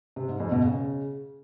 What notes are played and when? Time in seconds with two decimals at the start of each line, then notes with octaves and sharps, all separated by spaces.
0.16 C3
0.28 G#2
0.40 F2
0.52 B2
0.64 C#3